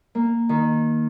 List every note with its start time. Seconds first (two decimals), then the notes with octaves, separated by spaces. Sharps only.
0.15 A#3
0.49 D#3